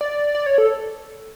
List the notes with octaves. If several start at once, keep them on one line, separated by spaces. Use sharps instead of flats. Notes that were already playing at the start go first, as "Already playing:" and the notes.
D5
D5
C#5
A4